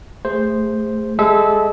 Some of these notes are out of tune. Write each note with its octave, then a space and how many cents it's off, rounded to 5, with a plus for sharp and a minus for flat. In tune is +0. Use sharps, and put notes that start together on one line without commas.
A3 +0 G#4 -25 C5 +0
G#3 -25 A4 -30 E5 -15